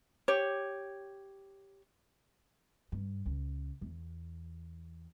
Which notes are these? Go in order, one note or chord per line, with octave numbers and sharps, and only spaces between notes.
G4 C#5
G2
C#2
E2